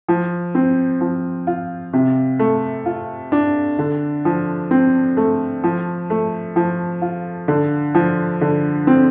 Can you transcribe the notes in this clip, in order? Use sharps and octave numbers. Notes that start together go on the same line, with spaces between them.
F3
C4
F3
F4
C3
A3
F4
D4
D3
F3
C4
A3
F3
A3
F3
F4
D3
F3
D3
C4